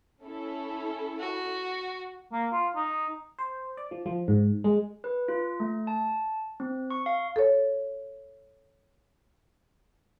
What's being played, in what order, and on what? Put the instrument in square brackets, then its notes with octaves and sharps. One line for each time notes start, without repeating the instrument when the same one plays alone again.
[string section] C#4 E4 A4
[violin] F#4
[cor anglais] A#3
F4
D#4
[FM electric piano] C5
D5
F3
F3
G#2
G#3
[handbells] B4
F4
A3
A5
C4
C#6
F5
[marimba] A4 C#5